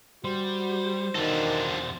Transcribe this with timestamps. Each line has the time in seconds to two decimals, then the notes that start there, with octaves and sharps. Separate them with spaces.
0.24 G3 F#4 C5
1.15 E2 D#3 D4 F4 F#4 A4